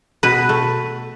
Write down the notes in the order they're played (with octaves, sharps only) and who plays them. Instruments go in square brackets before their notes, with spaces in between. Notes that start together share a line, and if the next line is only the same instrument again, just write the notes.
[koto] B2 B4
A3